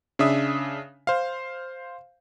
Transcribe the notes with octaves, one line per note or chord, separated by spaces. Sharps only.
C#3 D4 E5 D#6
C5 F5